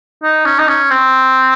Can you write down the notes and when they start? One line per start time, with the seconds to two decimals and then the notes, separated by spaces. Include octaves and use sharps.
0.23 D#4
0.45 C#4
0.59 D#4
0.68 C#4
0.90 C4